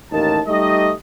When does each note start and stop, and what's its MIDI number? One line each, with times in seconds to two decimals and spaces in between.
0.11 0.41 33
0.11 0.41 39
0.11 0.41 63
0.11 0.41 70
0.11 0.41 81
0.47 0.92 55
0.47 0.92 57
0.47 0.92 63
0.47 0.92 67
0.47 0.92 75